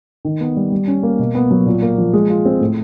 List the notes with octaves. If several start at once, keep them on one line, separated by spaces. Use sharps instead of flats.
D#3
B3
G3
G3
C#4
A#3
B2
B3
F#3
A#2
A#3
F3
G#3
F4
C4
A2